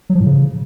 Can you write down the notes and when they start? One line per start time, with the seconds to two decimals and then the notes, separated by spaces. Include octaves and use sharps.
0.10 F#3
0.15 F3
0.20 A2
0.26 C#3